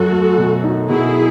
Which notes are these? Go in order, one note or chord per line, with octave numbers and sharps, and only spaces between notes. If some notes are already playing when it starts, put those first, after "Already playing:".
Already playing: F#2 F#4 A4
A3
B2
D#4
B2 E4 G#4